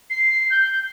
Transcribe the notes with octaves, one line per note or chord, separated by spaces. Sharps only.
C7
G6